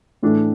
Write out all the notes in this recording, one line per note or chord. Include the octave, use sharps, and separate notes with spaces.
A2 E3 A3 D4